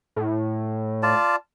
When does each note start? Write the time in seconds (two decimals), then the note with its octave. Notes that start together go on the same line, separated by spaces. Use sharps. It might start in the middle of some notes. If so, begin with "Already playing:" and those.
0.16 A2
1.03 F4 D5 A5